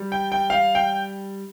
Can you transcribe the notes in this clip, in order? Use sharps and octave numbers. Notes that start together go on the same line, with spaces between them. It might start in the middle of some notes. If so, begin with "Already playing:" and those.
Already playing: G3
G5
G5
F5
G5